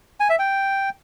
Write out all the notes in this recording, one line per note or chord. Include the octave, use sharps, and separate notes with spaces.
G#5
E5
G5